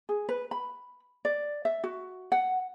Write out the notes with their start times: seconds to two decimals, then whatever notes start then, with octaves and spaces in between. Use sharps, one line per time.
0.09 G#4
0.29 B4
0.51 B5
1.25 D5
1.65 E5
1.84 F#4
2.32 F#5